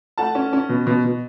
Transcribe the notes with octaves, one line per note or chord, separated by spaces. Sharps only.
A3 F#5 A5
C#4
C#4
B2
B2
B2